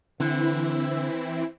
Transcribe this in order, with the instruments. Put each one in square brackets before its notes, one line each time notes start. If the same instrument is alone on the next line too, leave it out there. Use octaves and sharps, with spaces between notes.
[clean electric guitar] D3 [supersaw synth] E3 C4 E4